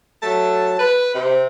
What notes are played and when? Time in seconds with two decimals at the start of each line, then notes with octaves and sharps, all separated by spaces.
0.23 F#3 A3 A5
0.80 B4
1.14 C3